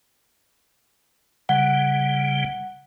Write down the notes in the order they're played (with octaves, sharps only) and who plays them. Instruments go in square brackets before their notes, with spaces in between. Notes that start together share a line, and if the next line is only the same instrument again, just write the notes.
[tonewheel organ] C#3 G3 [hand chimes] F#5